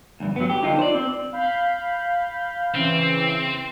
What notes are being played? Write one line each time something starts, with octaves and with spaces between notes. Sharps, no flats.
D2 G2
F#3 B3
G4
D3 D#4 F4
C5 D5
C4
F5 B5 G6
C#3 E3 C4